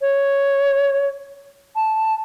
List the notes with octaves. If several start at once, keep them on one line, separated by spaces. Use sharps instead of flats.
C#5
A5